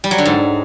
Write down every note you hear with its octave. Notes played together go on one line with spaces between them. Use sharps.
G3
F#3
D3
G#2